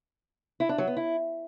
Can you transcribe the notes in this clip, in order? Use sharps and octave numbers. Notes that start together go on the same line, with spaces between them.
E4
D4
F#3
B3
E4